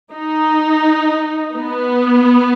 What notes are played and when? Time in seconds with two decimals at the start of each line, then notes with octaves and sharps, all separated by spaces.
0.12 D#4
1.56 B3